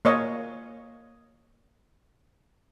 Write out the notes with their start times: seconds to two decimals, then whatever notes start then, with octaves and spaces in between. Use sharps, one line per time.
0.05 A#3 C#5 D#5